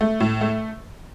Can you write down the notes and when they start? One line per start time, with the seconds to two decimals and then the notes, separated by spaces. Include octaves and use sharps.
0.01 A3
0.20 A2
0.41 A3